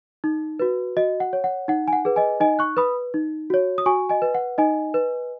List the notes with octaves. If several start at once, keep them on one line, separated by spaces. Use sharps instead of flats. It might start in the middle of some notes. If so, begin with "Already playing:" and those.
D#4
F#4 B4
F#4 D#5
F#5
C#5
F#5
D#4 F#5
G#5
F#5
G#4 B4
D#5 G#5
D#4 D#5 G#5
C#6 F#6
B4 B5 D#6
D#4
F#4 C#5
D#6
F#4 G#5 C#6
D#5 G#5
B4
F#5
D#4 D#5 G#5
B4